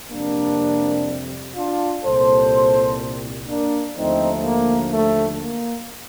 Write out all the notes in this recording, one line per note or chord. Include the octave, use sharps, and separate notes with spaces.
F2 C3 G3 A#3 D4
D4 F4
C2 A#2 G3 A4 C5
A#3 D4
D#2 D3 F3 A3 C4 D#4
A#3
A3
A#3